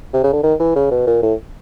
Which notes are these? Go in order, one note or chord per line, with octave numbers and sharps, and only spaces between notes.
C3
C#3
D3
D#3
E3
C#3
B2
A#2
A2